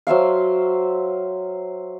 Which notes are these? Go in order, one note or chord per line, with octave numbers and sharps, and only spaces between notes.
F#3 C5 E5 F5